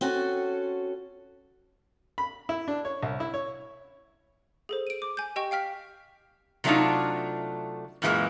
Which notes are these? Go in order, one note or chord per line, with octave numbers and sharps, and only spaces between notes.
C4 C#4 F#4 A4
B5
E4
D4
C#5
C2
E4
C#5
G#4 A4 C5
D7 D#7
D6
G#5 G6
G4 D#5 G5 C#6
F5 G5 F6 B6
C3 F#3 A3 D4 D#4 F4
F#2 A#2 E3 G#3 A#3